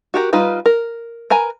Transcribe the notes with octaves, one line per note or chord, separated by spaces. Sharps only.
F#4 G4 A#4
G3 D#4 F4 B4
A#4
A#4 B4 G#5 A#5